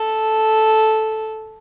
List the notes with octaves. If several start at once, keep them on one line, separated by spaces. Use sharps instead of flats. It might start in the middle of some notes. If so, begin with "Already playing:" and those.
Already playing: A4